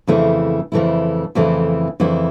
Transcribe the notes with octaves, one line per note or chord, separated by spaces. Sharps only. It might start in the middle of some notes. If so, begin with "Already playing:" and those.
F2 C#3 E3 A3 E4
F2 C#3 E3 A3 E4
F2 C#3 E3 A3 E4
F2 C#3 E3 A3 E4